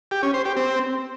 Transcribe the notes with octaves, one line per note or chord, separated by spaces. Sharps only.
G4
C#4
C5
G4
C4